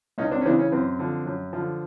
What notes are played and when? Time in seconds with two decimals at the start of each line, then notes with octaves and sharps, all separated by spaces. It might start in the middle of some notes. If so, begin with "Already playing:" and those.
0.18 C#2 C#4 D#4
0.31 C4 D4
0.41 C#4
0.45 C#3 E3 C4 D4
0.59 C#4
0.72 F#2 C4
0.99 D3 F3
1.26 F#2
1.53 D3 F3